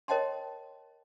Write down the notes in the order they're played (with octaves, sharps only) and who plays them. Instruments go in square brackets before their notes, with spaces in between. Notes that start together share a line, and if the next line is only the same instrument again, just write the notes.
[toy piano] A#4 C#5 D#5 G5 A5 C6